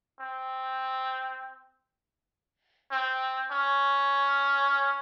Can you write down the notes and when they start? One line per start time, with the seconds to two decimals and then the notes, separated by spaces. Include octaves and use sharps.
0.20 C4
2.91 C4
3.51 C#4